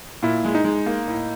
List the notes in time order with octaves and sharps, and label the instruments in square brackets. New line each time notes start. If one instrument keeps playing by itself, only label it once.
[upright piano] A#2 [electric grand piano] E4
[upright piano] G#3
[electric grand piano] D#4
[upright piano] G#3
A#3
A2